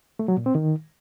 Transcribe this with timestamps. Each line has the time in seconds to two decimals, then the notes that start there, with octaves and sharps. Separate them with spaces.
0.19 A3
0.28 F#3
0.37 A#2
0.46 C4
0.55 D#3